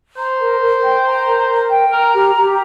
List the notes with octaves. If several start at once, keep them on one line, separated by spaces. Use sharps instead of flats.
C5 A#5
A#4
A#4
G5
A#5
A#4
A#4
G5
A#4 A#5
G4
G4